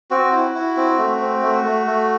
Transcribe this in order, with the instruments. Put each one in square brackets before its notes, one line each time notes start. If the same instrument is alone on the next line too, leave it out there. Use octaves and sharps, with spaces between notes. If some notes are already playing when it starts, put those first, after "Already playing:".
[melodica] C4 F#4
E4
E4
C4
A3
C4
A3
A3
A3